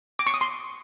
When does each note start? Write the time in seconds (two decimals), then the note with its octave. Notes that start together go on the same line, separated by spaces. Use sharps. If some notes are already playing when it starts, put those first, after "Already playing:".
0.19 D6
0.27 C#6
0.34 D#6
0.41 C6